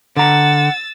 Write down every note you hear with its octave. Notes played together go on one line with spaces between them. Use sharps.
D3 F#5 A#5 E6 A6